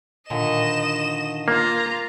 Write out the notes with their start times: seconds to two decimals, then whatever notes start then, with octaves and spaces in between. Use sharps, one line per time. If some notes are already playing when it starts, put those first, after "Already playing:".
0.30 A#2 D3 D#3 D#5 E7
1.48 A#3 F4 A#5